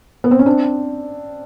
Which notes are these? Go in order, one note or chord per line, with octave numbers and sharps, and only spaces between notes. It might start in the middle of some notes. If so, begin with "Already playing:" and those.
B3
C4
C#4
C4 D4